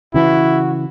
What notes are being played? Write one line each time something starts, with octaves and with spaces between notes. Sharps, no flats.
C#3 E3 E4 F#4